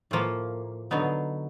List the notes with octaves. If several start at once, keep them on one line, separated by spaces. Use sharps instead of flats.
A2 F3 A#3
D3 F#3 B3 D#4